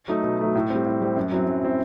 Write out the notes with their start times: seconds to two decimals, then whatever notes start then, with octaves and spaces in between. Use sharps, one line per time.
0.08 F#3 A3 D#4
0.24 B2
0.39 F#3 A3 D#4
0.55 A2
0.70 G3 C4
0.86 A2
1.01 G3 C4
1.16 F#2
1.32 F#3 C4 E4
1.47 F#2
1.63 F#3 C4 E4